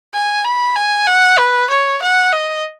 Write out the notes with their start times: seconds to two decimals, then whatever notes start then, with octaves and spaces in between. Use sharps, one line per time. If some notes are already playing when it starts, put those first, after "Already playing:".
0.14 G#5
0.45 B5
0.76 G#5
1.07 F#5
1.39 B4
1.70 C#5
2.02 F#5
2.32 D#5